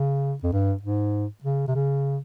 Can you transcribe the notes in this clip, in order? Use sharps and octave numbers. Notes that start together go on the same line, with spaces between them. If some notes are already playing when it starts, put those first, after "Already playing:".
Already playing: C#3
F2
G2
G#2
C#3
C3
C#3